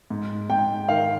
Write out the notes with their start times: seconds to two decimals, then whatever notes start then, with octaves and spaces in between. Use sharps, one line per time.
0.10 G#2
0.50 G#2 G5
0.89 D#3 F5